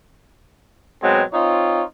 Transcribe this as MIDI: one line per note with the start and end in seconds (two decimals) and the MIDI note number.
1.02 1.23 47
1.02 1.23 54
1.02 1.23 56
1.02 1.23 60
1.33 1.83 60
1.33 1.83 63
1.33 1.83 65
1.33 1.83 73